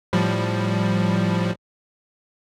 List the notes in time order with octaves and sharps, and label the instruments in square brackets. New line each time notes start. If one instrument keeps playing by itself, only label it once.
[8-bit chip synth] A2 F3 G3